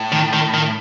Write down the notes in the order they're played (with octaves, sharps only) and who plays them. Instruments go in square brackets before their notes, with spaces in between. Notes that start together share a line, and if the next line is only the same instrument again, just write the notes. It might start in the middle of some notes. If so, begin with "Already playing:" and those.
Already playing: [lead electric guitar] A2
[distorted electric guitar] D#3
D#3
D#3